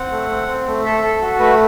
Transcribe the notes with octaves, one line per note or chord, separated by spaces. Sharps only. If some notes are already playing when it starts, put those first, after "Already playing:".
Already playing: C4 F#5
A3
C4
C4
A3
A4 E5
A4
F#4
A3 B4